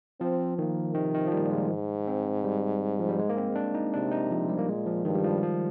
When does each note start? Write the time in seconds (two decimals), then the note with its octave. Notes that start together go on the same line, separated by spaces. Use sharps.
0.20 F3 C4
0.58 D#3 A#3
0.95 C3 D#3
1.14 D#3
1.27 F3
1.32 A#2 G3
1.51 G#3
1.69 G#2
2.08 C4
2.44 G3
2.99 F3
3.09 G3
3.19 G#3
3.29 A#3
3.38 C4
3.55 D4
3.75 D#4
3.94 C3 D4
4.11 D#4
4.31 F3
4.49 G3
4.58 A#3
4.68 A#2 G#3
4.86 F3
5.05 G2 D#3
5.15 G3
5.24 F3
5.43 F3